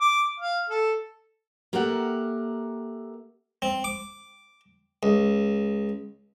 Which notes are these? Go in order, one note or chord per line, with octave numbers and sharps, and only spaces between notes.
D6
F5
A4
A#3 G4 A4 A#4 E5 F#5
C4
D6
C#2